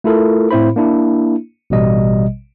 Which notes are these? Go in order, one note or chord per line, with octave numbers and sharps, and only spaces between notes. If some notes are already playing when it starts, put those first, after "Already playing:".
A3 E4 F4 A4 A#4
A2 C4 E4 C5 B5
A#3 D4 E4
A1 B2 G3 D#5